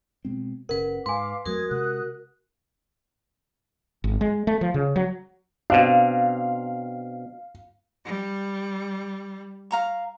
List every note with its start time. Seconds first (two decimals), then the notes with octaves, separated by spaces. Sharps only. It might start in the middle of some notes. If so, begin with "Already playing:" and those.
0.25 B2 G#3 C4
0.69 F#1 C#3 A#4 B4 F#5
1.06 G#2 B4 F5 G#5 C6 D6
1.46 F2 F#3 A3 F#4 A#4 D#6 G#6
1.69 C3 G#3 F#5 D#6 F#6
4.04 G#1
4.21 G#3
4.47 A3
4.61 F3
4.74 C#3
4.96 F#3
5.70 B2 C4 D4 F5
8.05 G3
9.71 F5 A#5 C#6